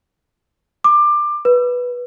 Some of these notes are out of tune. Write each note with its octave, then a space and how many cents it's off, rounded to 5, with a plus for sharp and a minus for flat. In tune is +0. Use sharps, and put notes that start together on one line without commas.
D6 +20
B4 -5